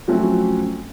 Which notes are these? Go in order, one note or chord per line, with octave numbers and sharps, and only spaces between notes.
F3 F#3 A3 C4 C#4 F#4